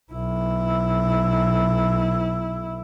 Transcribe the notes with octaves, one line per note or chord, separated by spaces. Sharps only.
B1 E4